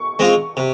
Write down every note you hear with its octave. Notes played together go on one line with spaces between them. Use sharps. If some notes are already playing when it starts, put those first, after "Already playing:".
Already playing: C#6
G#3 C4 F4
C3